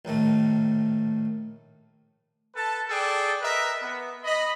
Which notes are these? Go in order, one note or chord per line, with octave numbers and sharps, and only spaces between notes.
A#1 A2 D#3 A3
A4 B4 A5
G#4 A4 D5 G5
A#4 B4 D#5 E5
B3
D#5 B5